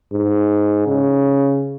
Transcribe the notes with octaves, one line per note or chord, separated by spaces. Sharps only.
G#2
C#3